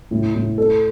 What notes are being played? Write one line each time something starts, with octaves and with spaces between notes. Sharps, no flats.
A2
A2
A4